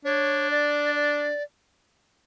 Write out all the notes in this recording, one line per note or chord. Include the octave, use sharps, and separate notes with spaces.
D4 C#5
D5
D5